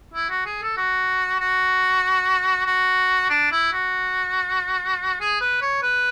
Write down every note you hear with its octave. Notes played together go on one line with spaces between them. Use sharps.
E4
F#4
G#4
A4
F#4
F#4
F#4
D4
E4
F#4
G#4
B4
C#5
B4